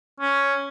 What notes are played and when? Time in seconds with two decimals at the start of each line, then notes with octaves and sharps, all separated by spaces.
0.20 C#4